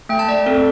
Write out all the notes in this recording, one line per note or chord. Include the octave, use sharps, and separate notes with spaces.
A3 G5
A5
A3 D5
C4 A4